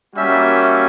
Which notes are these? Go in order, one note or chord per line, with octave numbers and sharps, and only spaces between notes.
G3 A#3 C#4 F#4 E5